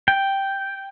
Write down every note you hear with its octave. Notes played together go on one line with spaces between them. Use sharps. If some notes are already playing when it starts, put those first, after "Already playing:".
G5